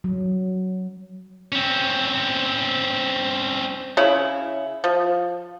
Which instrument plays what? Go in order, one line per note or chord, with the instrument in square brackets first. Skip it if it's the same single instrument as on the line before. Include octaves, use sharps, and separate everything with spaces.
[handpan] F#3
[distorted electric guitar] C4 C#4
[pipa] C#3 C#4 E4
F3